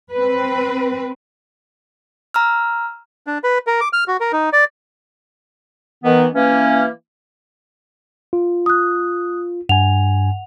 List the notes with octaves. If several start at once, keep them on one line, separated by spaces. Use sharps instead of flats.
C4 B4
A#5 E6 F6
D4
B4
A#4
D6
F6
F#4
A#4
D#4
D5
D#3 E3 B3
E3 A#3 C#4
F4
D#6 F#6
G2 F#5 G#5 F7